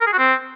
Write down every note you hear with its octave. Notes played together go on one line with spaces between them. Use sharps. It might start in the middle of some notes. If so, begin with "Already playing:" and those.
A#4
G#4
F#4
C4